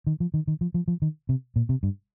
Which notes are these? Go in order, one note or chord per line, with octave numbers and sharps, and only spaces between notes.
D#3
F3
D#3
D#3
F3
F3
F3
D#3
C3
A#2
C3
G2